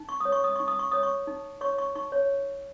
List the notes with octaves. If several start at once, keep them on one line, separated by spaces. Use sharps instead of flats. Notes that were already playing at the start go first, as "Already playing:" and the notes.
Already playing: D#4
C#6
C#5 D#6
C#6
D#6
D#4 C#6
D#6
C#6
C#5 D#6
C#6
D#4
C#5 C#6
C#6
D#4 C#6
C#5